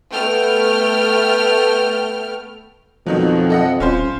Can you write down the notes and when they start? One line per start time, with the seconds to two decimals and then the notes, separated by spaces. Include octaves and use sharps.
0.12 A3 B3 G5 F6
3.06 F2 B2 D#3 F3 F#3
3.50 A4 D#5 F#5
3.80 D#1 C#4 F4 C5